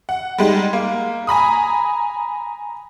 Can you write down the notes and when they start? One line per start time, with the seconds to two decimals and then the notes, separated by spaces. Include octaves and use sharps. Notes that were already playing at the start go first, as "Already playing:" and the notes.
0.09 F#5
0.38 G3 G#3 D#4
0.73 A#3
1.27 G#5 A#5 B5 D#6